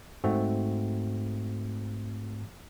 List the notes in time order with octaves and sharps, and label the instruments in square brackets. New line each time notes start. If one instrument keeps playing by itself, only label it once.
[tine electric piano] G#2 A3 C4 F#4